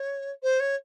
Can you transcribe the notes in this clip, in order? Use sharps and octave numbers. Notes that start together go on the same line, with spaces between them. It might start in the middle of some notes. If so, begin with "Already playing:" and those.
Already playing: C#5
C5
C#5